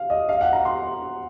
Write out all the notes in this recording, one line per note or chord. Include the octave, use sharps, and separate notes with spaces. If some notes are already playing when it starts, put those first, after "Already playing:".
Already playing: F5
D#5
F5
F#5
A#5
C6